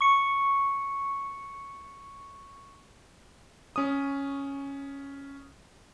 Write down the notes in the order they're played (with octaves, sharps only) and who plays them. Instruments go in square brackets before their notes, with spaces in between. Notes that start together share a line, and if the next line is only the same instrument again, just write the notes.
[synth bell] C#6 C#7
[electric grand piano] C#4 D#6